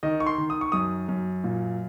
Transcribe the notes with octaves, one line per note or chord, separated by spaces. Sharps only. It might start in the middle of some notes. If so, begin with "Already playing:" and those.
D#3 D#5
C#6
C6
D#3
D#6
C#6
F#2 D#6
F#2
A#2